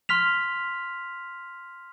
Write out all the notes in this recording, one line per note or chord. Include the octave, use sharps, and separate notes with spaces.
C6 F6 B6 F7